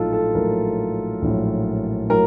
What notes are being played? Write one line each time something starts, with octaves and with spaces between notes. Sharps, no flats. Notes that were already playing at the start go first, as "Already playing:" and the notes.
Already playing: A#1 A2 F#3 D#4 F4 A4
A4
A#1 A2 F#3 A#4
A#1 A2 F#3
A2 F#3 A#4